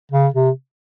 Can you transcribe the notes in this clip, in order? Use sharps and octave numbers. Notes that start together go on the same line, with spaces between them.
C#3
C3